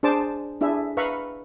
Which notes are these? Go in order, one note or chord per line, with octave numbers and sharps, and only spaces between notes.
D4 G#4 C5 A5 D6
D4 E4 G#4 E5
B4 E5 F5 A#5 B5 C#6